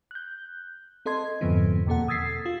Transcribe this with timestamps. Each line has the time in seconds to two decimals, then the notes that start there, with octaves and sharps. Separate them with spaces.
0.11 F#6 G6
1.06 C4 A4 D#5 C6 G#6
1.41 F2 G#2 D3 F3 B3 C4
1.87 E2 B2 A#3 A4 F#5
2.08 D#6 E6 G#6 A6 B6 C7
2.46 F4